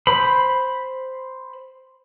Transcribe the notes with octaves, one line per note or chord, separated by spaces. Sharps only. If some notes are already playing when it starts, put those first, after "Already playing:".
C5 B5